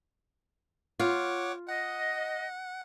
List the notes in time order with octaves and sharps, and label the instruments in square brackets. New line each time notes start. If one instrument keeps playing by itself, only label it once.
[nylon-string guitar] F4 [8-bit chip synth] C#5 F#5 D6
[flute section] D#5 [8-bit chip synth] F#5